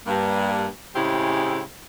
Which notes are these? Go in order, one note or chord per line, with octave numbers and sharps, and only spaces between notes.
G2 A#3
A2 C#3 G#3 C4 E4 G4